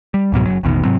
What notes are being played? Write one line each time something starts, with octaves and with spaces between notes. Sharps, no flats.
G3
C#2 G#2 B2 F#3
F#1 F#3
A1 E2 B2 D#3
G#2 C3 F#3 C4